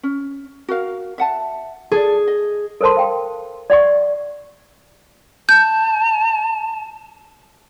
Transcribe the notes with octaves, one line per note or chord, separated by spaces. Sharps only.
C#4
F#4 A#4 F5
E5 F#5 A5
G#4 A4 D5
D#5
A4 A#4 C5 A5 C6
F5 G5
D5 F#5 C#6
A5 G6